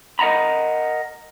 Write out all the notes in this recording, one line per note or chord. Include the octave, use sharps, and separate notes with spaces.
A#4 D#5 F#5 A#5 B5